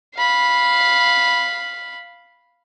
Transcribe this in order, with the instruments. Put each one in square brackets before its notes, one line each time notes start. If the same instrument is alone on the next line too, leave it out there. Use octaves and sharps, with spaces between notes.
[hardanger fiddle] F5 B5